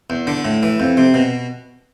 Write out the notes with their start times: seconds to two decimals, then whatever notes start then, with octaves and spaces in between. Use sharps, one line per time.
0.10 E2
0.27 D3
0.45 A2
0.63 E3
0.80 F2
0.97 C3
1.14 B2